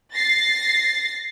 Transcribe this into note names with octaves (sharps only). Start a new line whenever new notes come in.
A6 A#6 C7